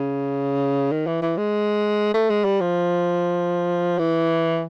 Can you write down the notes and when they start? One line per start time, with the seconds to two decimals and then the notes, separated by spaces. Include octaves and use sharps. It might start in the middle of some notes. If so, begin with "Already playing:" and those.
Already playing: C#3
0.92 D#3
1.07 E3
1.22 E3
1.37 G#3
2.14 A3
2.30 G#3
2.45 G3
2.61 F3
3.99 E3